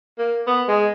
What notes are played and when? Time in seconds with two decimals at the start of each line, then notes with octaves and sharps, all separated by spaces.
0.18 A#3
0.47 B3
0.68 G#3